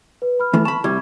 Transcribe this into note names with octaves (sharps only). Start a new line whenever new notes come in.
B4
B5 F6
E3 A3
A5 B5 C#6
C2 G3 C#6 G#6